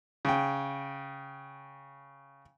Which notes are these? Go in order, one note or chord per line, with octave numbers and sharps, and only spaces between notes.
C#3 G5